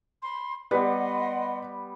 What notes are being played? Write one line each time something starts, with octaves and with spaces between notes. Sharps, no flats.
B5 C6
G3 B3 B4 D5 D#5 F#5 C6